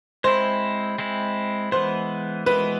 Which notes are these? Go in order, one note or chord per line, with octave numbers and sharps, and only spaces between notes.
G#3 C4 E4 C5
G#3 C4 E4
E3 G#3 B3 C5
E3 G#3 B3 B4